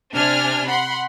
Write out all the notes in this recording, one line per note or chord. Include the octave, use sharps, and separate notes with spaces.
C3 D4 G#5 F6
F#5 B5 C6